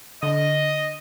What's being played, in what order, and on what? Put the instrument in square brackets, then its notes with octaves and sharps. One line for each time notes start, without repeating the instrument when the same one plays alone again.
[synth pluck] D3 [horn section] D#5